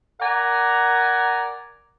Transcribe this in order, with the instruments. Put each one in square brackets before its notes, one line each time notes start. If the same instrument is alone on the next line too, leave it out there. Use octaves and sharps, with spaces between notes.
[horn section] A#4 D5 F#5 G#5 A#5